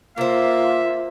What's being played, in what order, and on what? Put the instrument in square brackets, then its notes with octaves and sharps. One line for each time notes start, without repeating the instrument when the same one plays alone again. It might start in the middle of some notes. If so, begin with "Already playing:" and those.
[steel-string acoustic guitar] C3 C5 [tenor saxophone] A#3 [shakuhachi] F4 [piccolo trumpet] E5